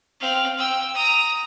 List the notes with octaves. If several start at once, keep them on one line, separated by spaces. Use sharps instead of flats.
C4 F5
G5 E6
A#5 D#6